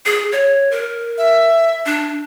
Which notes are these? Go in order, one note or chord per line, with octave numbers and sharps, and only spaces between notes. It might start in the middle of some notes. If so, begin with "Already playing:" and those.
G#4
C#5
A#4
E5
D4